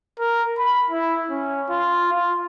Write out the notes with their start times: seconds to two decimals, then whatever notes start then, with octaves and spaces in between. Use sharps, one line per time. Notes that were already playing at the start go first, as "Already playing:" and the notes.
0.20 A#4
0.59 B5
0.91 E4
1.30 C#4
1.70 F4
2.13 F4